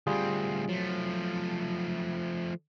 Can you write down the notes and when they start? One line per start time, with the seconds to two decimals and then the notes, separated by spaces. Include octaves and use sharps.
0.07 D2 G3 C4 F4 G#4
0.69 F3 F#3 A3